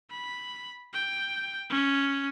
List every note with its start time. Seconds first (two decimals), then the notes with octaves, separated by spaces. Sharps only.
0.11 B5
0.93 G5
1.70 C#4